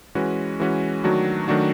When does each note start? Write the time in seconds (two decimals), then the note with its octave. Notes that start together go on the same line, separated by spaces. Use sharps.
0.15 E3 G#3 C#4 F#4 B4
0.60 E3 G#3 C#4 F#4 B4
1.04 D#3 F#3 A3 D4 F#4
1.48 D#3 F#3 A3 D4 F#4